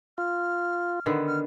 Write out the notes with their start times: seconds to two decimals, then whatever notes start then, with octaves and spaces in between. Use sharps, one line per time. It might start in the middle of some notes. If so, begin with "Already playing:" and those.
0.18 F4 F6
1.06 D3 D#3 B3
1.28 F6